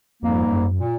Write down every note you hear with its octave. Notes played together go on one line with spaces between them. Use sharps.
F2 G#2 G3 A#3
F#2
A#2